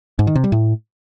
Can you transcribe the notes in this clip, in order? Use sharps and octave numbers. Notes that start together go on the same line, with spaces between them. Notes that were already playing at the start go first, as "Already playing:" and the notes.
G#2
D#3
C3
G3
A2